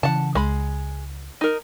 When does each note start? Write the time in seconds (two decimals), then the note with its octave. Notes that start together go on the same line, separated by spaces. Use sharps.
0.03 C#3 E3 F#5 A5
0.35 C#2 G#3 B5
1.41 D#4 A#4